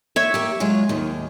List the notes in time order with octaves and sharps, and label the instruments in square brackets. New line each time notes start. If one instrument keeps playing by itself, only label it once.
[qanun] C#5 E5
[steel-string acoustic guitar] A#3 G4
F#3 G#3 F4
D#2 D#3